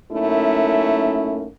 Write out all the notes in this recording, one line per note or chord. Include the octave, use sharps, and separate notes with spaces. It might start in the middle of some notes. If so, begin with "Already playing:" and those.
F#2 A3 A#3 C#4 D#4 E4